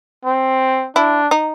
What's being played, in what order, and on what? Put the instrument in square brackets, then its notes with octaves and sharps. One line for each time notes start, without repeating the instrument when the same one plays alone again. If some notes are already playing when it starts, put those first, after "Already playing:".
[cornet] C4
[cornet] D4 [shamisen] E4
[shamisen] D#4